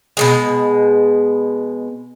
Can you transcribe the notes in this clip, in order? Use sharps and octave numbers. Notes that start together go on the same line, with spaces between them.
B2 E3 G#3